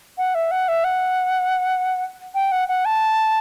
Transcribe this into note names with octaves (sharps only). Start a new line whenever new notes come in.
F#5
E5
F#5
E5
F#5
G5
F#5
F#5
A5